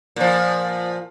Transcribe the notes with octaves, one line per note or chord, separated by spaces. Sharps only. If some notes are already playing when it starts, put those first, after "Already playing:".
A#2 F3